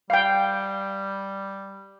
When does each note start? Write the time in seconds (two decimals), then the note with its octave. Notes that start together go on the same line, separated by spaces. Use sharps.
0.10 G3 F5 G5